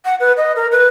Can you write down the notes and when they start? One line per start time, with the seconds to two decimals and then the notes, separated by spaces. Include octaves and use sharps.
0.05 F#5
0.20 B4
0.37 D#5
0.56 A#4
0.72 B4